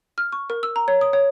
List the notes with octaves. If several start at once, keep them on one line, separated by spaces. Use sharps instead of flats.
F6
C#6
A#4
E6
A#5
C#5
D#6
C#5